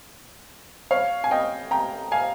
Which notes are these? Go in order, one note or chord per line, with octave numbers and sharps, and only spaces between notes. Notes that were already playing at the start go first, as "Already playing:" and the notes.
C#5 F5
G#5
D#5 G5
G5 A#5
F5 G#5